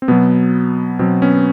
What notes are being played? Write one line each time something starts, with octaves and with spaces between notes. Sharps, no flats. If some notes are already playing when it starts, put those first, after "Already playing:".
C4
B2 F#3 B3
B2 F#3 C4
B3 C#4